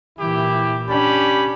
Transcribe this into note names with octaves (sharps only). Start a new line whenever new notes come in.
A#2 E3 E4 G4
C#4 D4 G4 B5